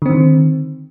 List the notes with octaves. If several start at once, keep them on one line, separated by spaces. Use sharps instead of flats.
D3 D#3 C4